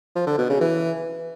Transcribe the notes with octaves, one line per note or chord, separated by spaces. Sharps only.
F3
D3
B2
C#3
E3